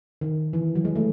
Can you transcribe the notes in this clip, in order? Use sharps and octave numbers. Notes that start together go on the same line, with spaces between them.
D#3
E3
F#3
G#3
A3